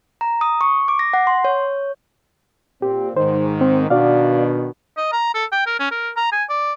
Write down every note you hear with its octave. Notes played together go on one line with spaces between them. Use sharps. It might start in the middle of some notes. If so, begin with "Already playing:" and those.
A#5
D#6
C#6
D6
A#6
F#5
C6
C#5
A#2 C4 G4
G#2 D#3 C5
C4
B2 D#3 D4 F#4 D5 F5
D#5
A#5
A4
G5
A#4
C#4
A#4
A#5
G#5
D5